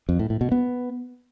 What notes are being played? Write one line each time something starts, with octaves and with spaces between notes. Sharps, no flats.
F2
A2
A2
B2
B3